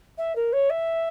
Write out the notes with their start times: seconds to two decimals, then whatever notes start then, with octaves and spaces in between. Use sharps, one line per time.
0.18 E5
0.35 A#4
0.53 C#5
0.70 E5